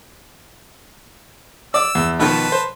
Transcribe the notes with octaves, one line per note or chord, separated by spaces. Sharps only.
D5 D6 E6
E2
B2 D#3 F3 B4 A5
C5